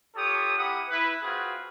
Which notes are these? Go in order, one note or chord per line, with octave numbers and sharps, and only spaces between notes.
F4 G4 A4 C#5 D#6
A#3 E4 G4 F#5 D#6
E4 B4
C4 F4 F#4 G#4 B4